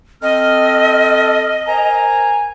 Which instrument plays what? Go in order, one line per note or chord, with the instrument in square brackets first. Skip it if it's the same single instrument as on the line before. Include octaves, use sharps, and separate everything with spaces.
[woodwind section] C4 F6 [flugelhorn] A4 [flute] D#5
[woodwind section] A#4 C5 A#5 [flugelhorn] G#5